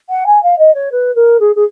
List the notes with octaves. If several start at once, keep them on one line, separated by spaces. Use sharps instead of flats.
F#5
G#5
F5
D#5
C#5
B4
A#4
G#4
G#4